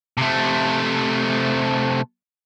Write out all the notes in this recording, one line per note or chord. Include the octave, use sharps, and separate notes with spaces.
C3 A3